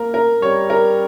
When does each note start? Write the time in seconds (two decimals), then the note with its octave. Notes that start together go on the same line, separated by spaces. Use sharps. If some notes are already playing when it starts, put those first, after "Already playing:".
Already playing: A#3 A#4
0.14 A#4
0.42 G3 C#5
0.70 A#4